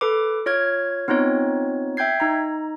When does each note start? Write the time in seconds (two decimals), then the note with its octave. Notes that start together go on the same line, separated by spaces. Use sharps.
0.01 A4 B4 D6
0.46 F4 C#5 F6 G#6
1.08 B3 C4 D#4 F4 C#5
1.97 E5 G5 G6 G#6 C7
2.20 D#4 A#5